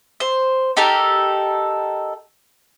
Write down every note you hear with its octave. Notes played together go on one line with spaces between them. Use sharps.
C5
D#4 G4 A4 A#4